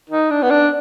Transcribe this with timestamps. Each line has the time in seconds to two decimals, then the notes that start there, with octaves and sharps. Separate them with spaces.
0.10 D#4
0.30 D4
0.43 B3
0.50 D4